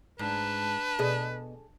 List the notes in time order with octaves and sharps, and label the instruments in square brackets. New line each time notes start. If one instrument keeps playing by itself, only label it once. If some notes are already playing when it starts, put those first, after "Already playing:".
[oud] G#2 [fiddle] D4 A5 [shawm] B4
[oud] B2 D#5 [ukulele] G#4 A4